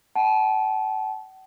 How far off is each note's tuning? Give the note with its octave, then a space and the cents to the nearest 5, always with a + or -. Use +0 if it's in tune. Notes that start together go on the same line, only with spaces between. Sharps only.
F#5 +45 A5 -30